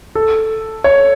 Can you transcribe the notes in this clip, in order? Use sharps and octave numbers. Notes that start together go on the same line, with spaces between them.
A4
C#5